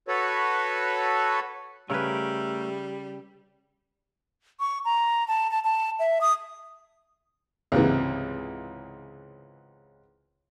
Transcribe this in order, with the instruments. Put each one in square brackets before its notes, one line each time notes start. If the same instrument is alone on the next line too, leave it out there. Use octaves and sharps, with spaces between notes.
[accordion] F#4 A4 B4 C#5
[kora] C#3 B4 [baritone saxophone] G3 [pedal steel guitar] A3 A#4 G#5
[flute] C#6
A#5
A5
A5
A5
E5
D#6
[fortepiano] C#2 G#2 C3 E3